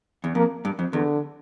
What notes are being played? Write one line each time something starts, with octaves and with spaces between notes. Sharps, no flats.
E2
F2 A#3
G2
F2
E2 D3